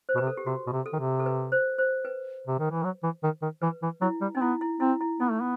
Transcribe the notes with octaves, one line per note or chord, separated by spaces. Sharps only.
C5
B2
C3 B4
A4
G4
C3 F#4
B2
C3
A4
D#3
C3
A4
B4
C5
C5
B4
C3
D#3
E3
F#3
E3
D#3
D#3
E3 B4
E3
F#3 E4
G3
C4 D#4
B3 E4
E4
C4 E4
E4
B3 D#4
A3
B3